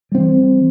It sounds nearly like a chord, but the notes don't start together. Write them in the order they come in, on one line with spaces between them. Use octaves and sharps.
G3 C4 E3